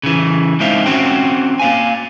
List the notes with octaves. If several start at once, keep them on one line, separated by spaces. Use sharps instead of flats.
C#3 E3
G#3 C4 D#4 C5 E5 F5
C4 C#4 F#4 C5 G5
A#3 F5 G#5